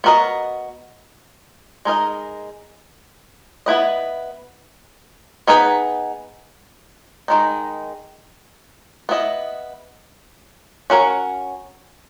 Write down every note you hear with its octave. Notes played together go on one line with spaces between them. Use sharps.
B3 F#4 A#4 D#5
G#3 D#4 A#4 D#5
B3 E4 B4 D#5
B3 D#4 G#4 B4
D#3 G#3 D#4
B3 E4 G#4 D#5
C#4 F#4 A#4